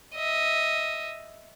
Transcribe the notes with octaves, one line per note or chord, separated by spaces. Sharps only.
D#5 E5